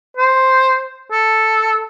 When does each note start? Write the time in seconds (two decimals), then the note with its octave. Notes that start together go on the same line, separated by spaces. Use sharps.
0.17 C5
1.12 A4